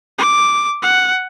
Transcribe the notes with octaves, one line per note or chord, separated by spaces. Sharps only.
D6
F#5